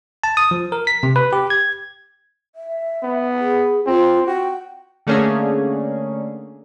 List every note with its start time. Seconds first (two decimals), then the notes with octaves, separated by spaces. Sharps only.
0.24 A5
0.37 D#6
0.51 F3
0.72 A#4
0.87 B6
1.03 C3
1.16 B4
1.33 G4
1.50 G#6
2.55 E5
3.03 B3
3.39 G#4
3.87 C4 F4
4.27 F#4 G5
5.07 D3 A3 A#3 C#4 D4 G#4